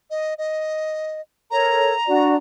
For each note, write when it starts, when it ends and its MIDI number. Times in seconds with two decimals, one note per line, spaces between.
0.10 0.34 75
0.38 1.21 75
1.51 1.92 69
1.51 1.92 70
1.51 1.92 73
1.51 2.37 82
2.06 2.34 62
2.06 2.34 66
2.06 2.34 74